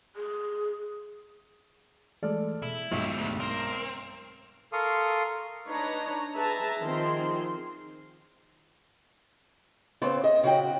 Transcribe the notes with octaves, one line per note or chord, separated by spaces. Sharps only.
G#4
E3 G#3 A3 A4 D5 F6
B2 E4
B1 G2 D#3 G3 G#3
D2
C4 A#4
A4 A#4 F5 C6 C#6 D#6
D4 D#4 B4 C#5 A#5
G#4 B4 E5 A5 A#5
D#3 F3 C4 G#4 C6
C#3 B3 C4
D#5 E5
C#3 F#4 G5